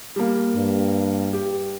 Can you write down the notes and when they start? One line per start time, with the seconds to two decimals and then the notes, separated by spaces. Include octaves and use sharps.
0.16 G3 A#3
0.56 G2
1.33 G4